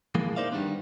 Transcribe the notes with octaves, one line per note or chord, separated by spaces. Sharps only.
A#2 E3 F3 G#3 A#3
D#4 A#4 C5 D5 E5 F5
G2 D#3 G3 B3 C4 D4